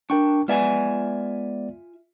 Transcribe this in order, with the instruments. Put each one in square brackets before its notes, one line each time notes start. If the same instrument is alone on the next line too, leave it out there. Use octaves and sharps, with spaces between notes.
[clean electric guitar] D4 [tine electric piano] A#4 G5 C#6
[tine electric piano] G#3 B3 D5 [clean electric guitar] F4 E5 G#5